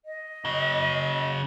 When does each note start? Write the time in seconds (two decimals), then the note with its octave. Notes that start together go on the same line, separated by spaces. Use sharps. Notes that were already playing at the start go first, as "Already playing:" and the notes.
0.05 D#5
0.45 C#3 F#3